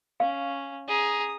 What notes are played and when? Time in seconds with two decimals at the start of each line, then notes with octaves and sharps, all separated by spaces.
0.20 C#4 F5
0.88 G#4 A#5 D#6